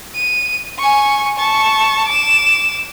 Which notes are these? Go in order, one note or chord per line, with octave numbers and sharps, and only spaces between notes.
D#7
G#5 C#6
A5 C#6
D6 E7